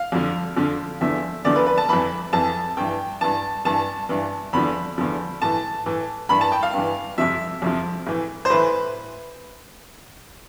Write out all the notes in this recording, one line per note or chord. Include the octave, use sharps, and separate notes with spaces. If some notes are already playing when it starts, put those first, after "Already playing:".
Already playing: F5
F2 D3 F3
F2 D3 F3
E2 D3 F3 E5
E2 D3 F3 D5
B4
B4
A5
F2 E3 B5
F2 E3 A5
G2 E3 G5
G2 E3 A5
G2 E3 A5
G2 E3
E2 D3 F3 B5
E2 D3 F3
A2 E3 A5
A2 E3
G2 E3 B5
A5
G5
F5
G2 E3
F2 C3 F3 E5
F2 C3 F3
A2 E3
C5
A2 E3 B4